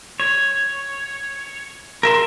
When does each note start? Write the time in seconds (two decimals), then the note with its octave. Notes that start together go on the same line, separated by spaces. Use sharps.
0.20 C#5
2.03 A#4 E5 C6